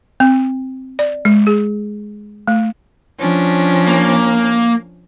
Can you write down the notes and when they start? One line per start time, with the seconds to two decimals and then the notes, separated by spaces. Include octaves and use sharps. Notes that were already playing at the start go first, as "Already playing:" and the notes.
0.20 C4
0.99 D5
1.25 G#3
1.47 G#4
2.48 A3
3.19 F3 C#4 D4
3.88 A#3